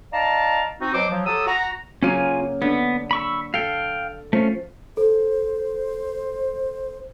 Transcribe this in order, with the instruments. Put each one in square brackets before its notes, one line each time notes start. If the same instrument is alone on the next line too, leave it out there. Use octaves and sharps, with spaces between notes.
[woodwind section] D#4 D5 F5 A5 A#5
C4 D#4 F#4
B2 F#3 C5 D6
F3 F#3
F#3 G4 A4 D#6 E6
F#4 A#5
[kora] C#3 F#3 A#3 [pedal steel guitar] C#4 F4 G#5
[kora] D3 [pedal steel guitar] B3
[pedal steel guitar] B5 C#6 E6
[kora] A4 [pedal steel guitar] F5 G5
[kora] F3 [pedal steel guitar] A3 C#4
[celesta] A4 [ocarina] C5